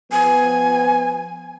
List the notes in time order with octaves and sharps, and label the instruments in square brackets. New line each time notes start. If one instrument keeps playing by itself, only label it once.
[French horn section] F3 B3 [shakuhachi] G#5